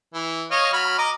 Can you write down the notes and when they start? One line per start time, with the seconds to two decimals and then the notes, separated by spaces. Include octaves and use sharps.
0.14 E3
0.51 C#5 D#5 F5
0.73 F#3 B5 F6
0.98 D#5 A#5 D6